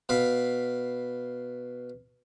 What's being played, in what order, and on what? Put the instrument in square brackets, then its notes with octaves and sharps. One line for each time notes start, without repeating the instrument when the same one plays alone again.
[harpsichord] B2 F5 B5